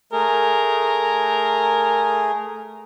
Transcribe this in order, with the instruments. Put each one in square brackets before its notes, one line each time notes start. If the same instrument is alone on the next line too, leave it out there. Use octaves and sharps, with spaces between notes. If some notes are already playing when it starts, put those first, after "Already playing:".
[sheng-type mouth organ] A3 G#4 [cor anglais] A#4